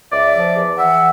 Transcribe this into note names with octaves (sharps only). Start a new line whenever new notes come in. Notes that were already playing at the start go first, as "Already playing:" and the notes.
C#2 D5 E5
F3
E2
E3 E5 F#5